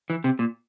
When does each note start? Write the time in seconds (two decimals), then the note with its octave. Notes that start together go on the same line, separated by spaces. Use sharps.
0.10 E3
0.24 C3
0.39 A#2